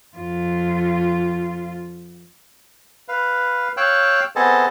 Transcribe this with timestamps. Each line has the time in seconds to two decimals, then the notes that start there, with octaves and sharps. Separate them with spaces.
0.17 F2 F4
3.08 B4 F5
3.77 C#5 F5 G5 E6 F#6
4.36 B3 C4 G#4 A4 D#5 A5